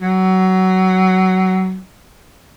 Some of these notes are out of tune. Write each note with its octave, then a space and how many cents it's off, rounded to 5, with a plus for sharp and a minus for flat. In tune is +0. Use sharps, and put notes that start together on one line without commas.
F#3 +20